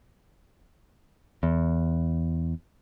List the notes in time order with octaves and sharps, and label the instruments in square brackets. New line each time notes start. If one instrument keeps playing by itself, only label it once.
[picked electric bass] E2